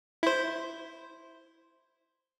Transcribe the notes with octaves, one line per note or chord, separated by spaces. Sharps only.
E4 C5